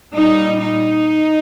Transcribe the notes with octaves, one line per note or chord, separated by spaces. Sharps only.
A#2 G3 D#4
D#4